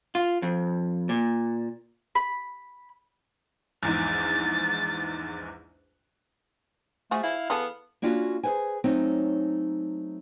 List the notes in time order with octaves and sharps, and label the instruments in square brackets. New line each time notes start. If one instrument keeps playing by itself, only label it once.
[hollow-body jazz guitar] F4
F2
A#2
[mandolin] B5
[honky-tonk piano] A#1 E2 G#2 [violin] A6
[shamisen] F3 F#4 G#4 [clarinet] A3
[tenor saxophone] E4 [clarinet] F5
[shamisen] E3 G#4 A4 [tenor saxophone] B3
[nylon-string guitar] A#3 C#4 D4 F4 F#4
G#4 A4 B4 C5 G#5
F#3 A3 C4 C#4 D#4